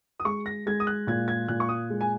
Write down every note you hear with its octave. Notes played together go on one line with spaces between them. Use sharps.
D#6
G#3 C#6
A#6
G#3 G#6
D#6
F#6
A#2 G#6
G#6
A#2 F#6
C#6
D#6
G#3
G#5